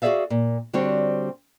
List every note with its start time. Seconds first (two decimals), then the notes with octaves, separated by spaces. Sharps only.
0.02 F#4 G#4 C#5 D5 E5 F5
0.30 A#2
0.73 D3 G3 C4 F#4 C5 C#5